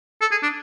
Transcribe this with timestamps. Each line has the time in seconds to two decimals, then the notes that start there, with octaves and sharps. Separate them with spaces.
0.21 A4
0.31 G#4
0.43 D4